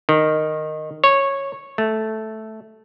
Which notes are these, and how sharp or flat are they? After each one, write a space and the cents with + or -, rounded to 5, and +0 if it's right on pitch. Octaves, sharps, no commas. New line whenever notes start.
D#3 -10
C#5 -10
A3 -5